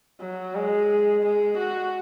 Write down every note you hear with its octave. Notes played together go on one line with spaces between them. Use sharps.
F#3
G#3
G#3
F#4